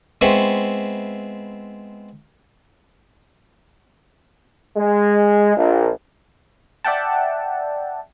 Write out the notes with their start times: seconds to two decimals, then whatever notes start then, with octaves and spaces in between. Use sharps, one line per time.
0.21 G#3 B3 C4 E4 C#6
4.77 G#3
5.57 A#1
6.84 D5 E5 F#5 G5 A5